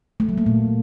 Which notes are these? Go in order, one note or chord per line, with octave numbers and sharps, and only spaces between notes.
A3
F#3
A#3
A#2